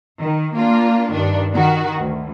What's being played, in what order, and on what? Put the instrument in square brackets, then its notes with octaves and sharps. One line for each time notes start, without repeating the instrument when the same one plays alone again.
[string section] D#3
A#3 D4 F4
G2 D#3 D4
D#3 F#4
D2